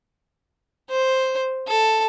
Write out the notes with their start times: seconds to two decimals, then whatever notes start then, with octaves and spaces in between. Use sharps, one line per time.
0.91 C5
1.68 A4